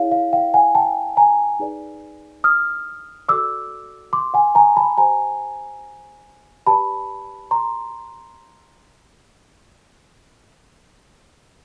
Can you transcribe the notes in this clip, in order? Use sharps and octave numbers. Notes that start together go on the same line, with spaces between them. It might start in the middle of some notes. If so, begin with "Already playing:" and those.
Already playing: E4 G#4 C#5 F5
F5
F5 G5
F#5 G#5
G5 A5
G#5 A#5
D#4 G#4 B4 D5
D#6 F6
F#4 A4 D5 D6 E6
C6 D6
F#5 G#5
G#5 A#5
A5 B5
G4 C5 G#5 A#5
G4 B4 D5 A5 B5
A#5 C6